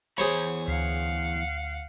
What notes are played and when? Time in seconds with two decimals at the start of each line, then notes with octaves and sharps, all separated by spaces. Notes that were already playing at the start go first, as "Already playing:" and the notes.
0.18 E2 G#4 C5 C#5 B5
0.68 D2 F5 F#5